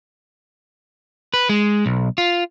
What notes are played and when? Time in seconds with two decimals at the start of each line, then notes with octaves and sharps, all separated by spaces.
1.34 B4
1.49 G#3
1.86 B1
2.18 F4